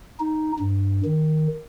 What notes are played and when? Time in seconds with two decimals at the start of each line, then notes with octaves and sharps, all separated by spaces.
0.20 D#4
0.59 G2
1.05 D#3